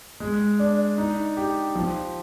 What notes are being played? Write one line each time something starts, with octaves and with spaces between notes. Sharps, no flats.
G#3
D4
D#4
G4
F3